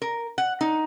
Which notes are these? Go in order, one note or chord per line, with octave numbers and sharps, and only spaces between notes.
A#4
F#5
D#4